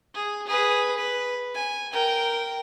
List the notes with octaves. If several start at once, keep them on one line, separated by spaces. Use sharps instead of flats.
G#4
G#4 B4
B4
G#5
A#4 G5